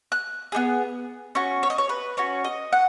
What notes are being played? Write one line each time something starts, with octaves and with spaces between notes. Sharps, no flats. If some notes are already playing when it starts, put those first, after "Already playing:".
F#6
B3 D#4 G#4
C#4 F#4 C#6
C#5
D#5
C#5
B4
C#4 F#4 C#5
D#5
F#5